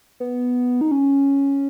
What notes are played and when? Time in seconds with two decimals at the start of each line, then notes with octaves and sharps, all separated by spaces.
0.20 B3
0.81 D#4
0.91 C#4